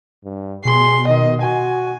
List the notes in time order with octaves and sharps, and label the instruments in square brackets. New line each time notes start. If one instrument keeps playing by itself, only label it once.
[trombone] G2
[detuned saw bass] B2 [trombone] G#4 [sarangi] C6
[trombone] D#3 [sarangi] D#5
[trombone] F#4 [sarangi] G#5